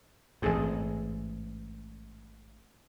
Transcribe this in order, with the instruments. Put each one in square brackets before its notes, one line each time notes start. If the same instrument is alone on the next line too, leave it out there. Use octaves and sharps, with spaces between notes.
[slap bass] A1 G#2 [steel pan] C4 G#4 A4